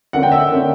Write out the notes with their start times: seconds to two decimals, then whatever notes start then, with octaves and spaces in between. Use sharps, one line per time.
0.13 D3 A#3 C#4 F#5
0.23 G5
0.32 E5
0.50 D3 A#3 C#4